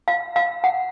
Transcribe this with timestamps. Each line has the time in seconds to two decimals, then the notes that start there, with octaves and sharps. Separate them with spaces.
0.08 F5
0.36 F5
0.64 F#5